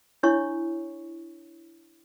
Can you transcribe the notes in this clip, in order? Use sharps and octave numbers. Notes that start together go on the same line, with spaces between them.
D4 E4 C#5 C#6